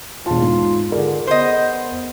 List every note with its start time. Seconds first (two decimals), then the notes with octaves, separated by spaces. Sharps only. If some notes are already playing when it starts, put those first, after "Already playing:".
0.26 E1 F4 A5
0.42 G#2
0.92 D3 G#4 A#4 D5
1.27 B3 C5 D#5